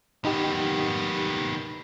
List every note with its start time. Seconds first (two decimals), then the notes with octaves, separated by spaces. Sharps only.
0.25 D#3 B3 D#4 G4